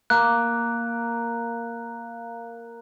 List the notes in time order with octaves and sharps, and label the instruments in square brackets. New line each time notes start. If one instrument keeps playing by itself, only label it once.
[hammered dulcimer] A#3 [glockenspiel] F#6